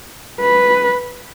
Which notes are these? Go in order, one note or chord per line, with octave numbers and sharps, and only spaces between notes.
B4